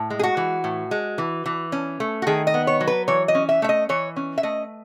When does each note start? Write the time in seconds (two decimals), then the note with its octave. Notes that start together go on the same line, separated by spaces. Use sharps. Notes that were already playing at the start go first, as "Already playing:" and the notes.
Already playing: A2
0.10 G#3
0.19 G#4
0.23 F#4
0.37 E3
0.64 A2
0.91 G#3
1.18 E3
1.46 E3
1.72 C#4
2.00 A3
2.22 F#4
2.27 D#3 G#4
2.47 D#5
2.54 B3
2.67 C#5
2.80 F#3
2.87 B4
3.08 E3 C#5
3.28 D#5
3.35 C#4
3.49 E5
3.62 A3 E5
3.69 D#5
3.89 E3 C#5
4.16 C#4
4.38 E5
4.43 A3 D#5